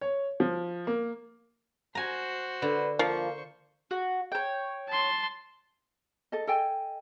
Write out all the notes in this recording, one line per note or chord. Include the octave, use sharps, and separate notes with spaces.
C#5
F3
A#3
F#4 C5 G#5 A#5
D3 B4
F3 A#3 C5 C#6
F#4
C#5 G5
A5 C6
A4 D#5
A4 D#5 G5 G#5